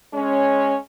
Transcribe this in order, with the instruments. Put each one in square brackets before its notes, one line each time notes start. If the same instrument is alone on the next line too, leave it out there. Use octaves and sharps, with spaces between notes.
[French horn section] G#3 C#4